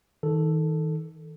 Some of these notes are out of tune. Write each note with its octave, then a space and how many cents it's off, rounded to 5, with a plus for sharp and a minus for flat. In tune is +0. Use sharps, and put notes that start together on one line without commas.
D#3 +30 A4 +0